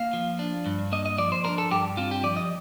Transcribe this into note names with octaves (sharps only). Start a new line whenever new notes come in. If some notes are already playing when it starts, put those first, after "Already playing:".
Already playing: A#3 F5
F3
D4
G2
A#3 D#5
D#5
F3 D5
C5
D4 A#4
A4
G2 G4
C4 F4
G4
F3 D5
D#5